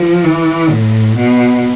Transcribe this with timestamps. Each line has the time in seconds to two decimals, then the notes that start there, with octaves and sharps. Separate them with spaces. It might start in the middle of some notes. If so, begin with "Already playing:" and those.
Already playing: F3
0.24 E3
0.70 A2
1.16 B2